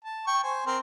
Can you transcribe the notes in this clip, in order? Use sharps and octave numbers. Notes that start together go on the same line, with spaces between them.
A5
G5 C#6
C5 G#5
C4 A#4 C6